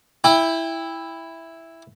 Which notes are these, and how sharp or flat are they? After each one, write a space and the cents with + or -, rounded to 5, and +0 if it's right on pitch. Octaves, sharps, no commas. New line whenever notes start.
E4 +0 G5 +30